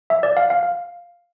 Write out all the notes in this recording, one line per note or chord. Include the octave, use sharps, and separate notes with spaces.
E5
D5
F5
F5
F5